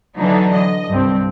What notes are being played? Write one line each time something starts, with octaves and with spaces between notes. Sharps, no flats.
D3 E3 F#3 D4 D#4
D#5
C2 G2 C4